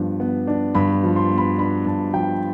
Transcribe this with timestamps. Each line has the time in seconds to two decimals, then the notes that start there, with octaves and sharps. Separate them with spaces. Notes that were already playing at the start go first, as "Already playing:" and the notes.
Already playing: G2 F3 B3 D4
0.20 B3
0.47 D4
0.75 G2 B5
1.03 F3
1.16 C6
1.31 B3
1.38 B5
1.58 D4 B5
1.86 G2 A5
2.14 F3 G5